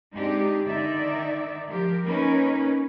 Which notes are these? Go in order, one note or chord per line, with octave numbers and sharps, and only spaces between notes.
G#3 C4 D4 D#4 G4
D3 D#3 D#4 D5 E5
F3 G4 A#4
A#3 C#4 D#4 A#4 B4